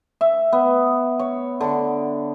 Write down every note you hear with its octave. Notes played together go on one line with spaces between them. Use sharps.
E5
B3
C#5
D3